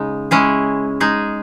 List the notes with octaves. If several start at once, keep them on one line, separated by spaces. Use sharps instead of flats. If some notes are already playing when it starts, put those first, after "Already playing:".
Already playing: C#3 G#3 D#4
G#3 C#4 E4 G#4
G#3 D#4 G#4